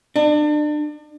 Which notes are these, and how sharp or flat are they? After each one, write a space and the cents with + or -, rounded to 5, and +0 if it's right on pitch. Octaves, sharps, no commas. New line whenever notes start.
D4 +35